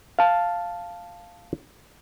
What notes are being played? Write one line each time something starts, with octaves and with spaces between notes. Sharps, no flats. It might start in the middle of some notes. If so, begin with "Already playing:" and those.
F5 A5